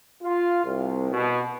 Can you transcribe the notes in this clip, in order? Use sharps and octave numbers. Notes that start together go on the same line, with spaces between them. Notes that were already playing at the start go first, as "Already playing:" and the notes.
F4
C2
B2